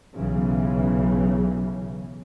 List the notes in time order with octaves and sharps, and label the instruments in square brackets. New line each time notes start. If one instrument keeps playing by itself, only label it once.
[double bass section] B1 C#3 E3